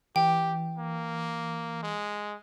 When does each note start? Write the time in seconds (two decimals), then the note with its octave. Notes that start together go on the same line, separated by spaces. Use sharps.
0.16 E3 G4 G5
0.78 A#3
1.83 G#3